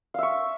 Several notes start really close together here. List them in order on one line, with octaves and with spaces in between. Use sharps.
F5 E5 C#6